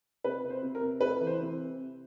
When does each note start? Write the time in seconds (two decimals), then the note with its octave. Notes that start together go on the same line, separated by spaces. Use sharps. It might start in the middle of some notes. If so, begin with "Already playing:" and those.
0.24 C3 B4
0.43 C3
0.50 C5
0.62 C3
0.75 A#4
0.81 C3
1.01 A3 B4
1.21 E3
1.27 C5
1.40 C3